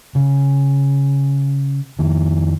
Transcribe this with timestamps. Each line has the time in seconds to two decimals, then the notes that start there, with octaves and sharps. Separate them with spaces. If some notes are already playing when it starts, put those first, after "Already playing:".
0.15 C#3
1.99 F2 D#3